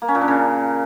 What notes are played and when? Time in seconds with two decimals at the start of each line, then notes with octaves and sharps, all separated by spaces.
0.02 A#3
0.08 C#4
0.15 A#2
0.21 D4
0.28 C#3